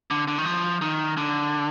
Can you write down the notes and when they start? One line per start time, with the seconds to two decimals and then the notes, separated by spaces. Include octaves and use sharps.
0.11 D3
0.28 D3
0.38 D#3
0.45 F3
0.81 D#3
1.17 D3